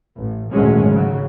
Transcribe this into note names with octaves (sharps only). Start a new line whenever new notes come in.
A1
G#1 D2 A#2 F#3 G#3 C#4
C#3 F#3